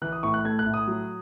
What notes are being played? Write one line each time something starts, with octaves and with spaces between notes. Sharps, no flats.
E3 F#6
D#6
A2 C#6
F#6
A3 G#6
F#6
A2
D#6
F#3